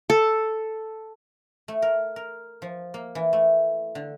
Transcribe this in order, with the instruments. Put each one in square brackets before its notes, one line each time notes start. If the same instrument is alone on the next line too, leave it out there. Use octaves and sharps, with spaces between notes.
[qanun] A4
[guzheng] A3
A#4
A#4
F3
A#3
E3
A3
D3